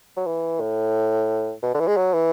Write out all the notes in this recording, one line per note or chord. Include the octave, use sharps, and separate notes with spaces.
F#3
E3
A2
B2
D3
E3
G#3
F#3
E3